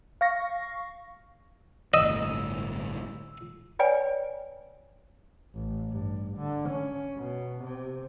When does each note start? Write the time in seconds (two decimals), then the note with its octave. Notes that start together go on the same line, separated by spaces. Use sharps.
0.21 F5 C#6 A#6
1.94 G1 C2 A2 D#5 E6
3.79 B4 C#5 D5 G5 G#5
5.54 A1
5.90 G2
6.38 D3
6.69 C#4
7.17 B2
7.63 C3